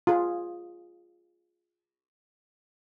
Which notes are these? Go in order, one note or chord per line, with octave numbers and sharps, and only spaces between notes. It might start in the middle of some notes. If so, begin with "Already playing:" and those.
F4 G#4